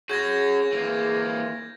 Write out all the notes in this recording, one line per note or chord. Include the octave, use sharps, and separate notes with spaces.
C#4 F#4 G#4 G6 G#6 A#6
E3 A#3